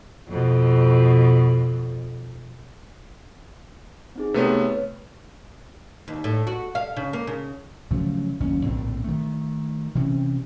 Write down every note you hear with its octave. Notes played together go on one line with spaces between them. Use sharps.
F2 B2
C4 D#4 G#4
C3 A3 B3 B4 C#5
D#2
A2
F#4
F5
C#3
A#3
C#3
C#3 F3 F#3 A3
F#1 D#2 C#4
A#1 A2 D3 C4
D#3 A3
C3 E3 C4 C#4